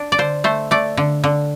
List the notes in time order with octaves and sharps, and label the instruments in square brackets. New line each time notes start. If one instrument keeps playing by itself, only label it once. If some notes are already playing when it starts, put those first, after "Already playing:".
Already playing: [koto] D4
D5
D3 C5
A3 C5
A3 D5
D3
D3